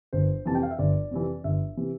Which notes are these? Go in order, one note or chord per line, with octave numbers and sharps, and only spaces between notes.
G1 C5
F2 C3 E3 A5
G5
F5
E5
G1 D5
F2 C3 E3
G1 E5
C3 E3